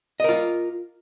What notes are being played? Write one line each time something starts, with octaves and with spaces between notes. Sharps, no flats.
F4 A#4 D#5